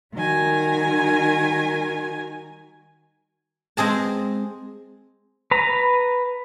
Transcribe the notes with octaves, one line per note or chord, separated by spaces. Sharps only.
D#3 G3 F#4 A#4 G#5
G#3 C4 G#4 A5
B4 A#5